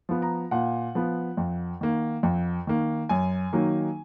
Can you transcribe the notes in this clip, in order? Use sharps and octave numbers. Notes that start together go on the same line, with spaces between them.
F3 B3
A#5
A#2 F#5
F3 B3
F2
D#3 A#3
F2
D#3 A#3
F#2 G#5
D#3 F#3 A#3 D#4